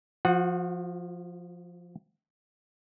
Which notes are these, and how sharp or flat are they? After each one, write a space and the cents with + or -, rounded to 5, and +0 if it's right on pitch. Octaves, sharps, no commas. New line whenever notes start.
F3 +0 F#4 -40 F#5 +0